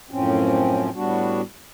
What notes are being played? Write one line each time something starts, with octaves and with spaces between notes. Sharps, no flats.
F#2 A2 F3 C4 C#4
A2 G3 B3 D4 F#4